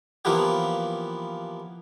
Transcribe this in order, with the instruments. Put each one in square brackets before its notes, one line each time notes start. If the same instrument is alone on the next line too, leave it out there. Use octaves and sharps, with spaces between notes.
[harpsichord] E3 F3 A#3 B3 G4